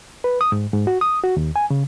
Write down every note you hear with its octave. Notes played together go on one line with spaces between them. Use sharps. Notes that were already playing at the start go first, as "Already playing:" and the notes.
B4
D#6
G#2
G#2
F#4
D#6
F#4
D#2
G#5
C#3